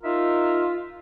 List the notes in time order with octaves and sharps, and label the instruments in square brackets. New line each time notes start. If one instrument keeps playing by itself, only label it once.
[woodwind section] D#4 A#4 E5 [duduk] F4